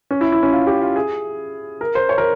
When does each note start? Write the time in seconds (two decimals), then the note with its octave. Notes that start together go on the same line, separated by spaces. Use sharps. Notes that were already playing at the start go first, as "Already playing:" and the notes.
0.11 C#4
0.21 E4
0.32 E4
0.43 C#4
0.53 F4
0.67 G4
0.81 F4
0.96 G#4
1.81 A#4
1.95 C5
2.09 C#5
2.18 A#4